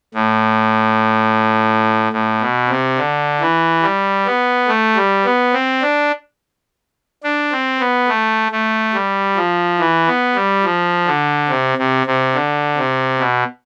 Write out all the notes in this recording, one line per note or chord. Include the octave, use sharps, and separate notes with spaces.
A2
A2
B2
C3
D3
E3
G3
B3
A3
G3
B3
C4
D4
D4
C4
B3
A3
A3
G3
F3
E3
B3
G3
F3
D3
C3
C3
C3
D3
C3
B2